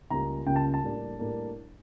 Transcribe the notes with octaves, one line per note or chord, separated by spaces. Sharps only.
C#2 C#3 G3 A#3 A#5
C#2 C#3 G3 A#3 G5
A5
A5
A2 G3 A#3 D4
A2 G3 A#3 D4